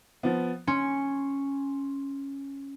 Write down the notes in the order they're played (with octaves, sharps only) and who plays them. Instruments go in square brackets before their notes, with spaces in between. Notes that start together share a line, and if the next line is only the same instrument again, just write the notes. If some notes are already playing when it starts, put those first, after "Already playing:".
[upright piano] F3 B3
[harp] C#4 [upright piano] C6